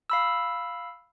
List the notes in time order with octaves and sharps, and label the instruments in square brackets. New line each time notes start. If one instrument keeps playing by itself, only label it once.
[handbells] F5 B5 E6